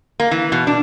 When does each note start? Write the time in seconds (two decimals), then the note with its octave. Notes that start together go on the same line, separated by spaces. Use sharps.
0.20 A#3
0.31 E3
0.52 B2
0.67 D4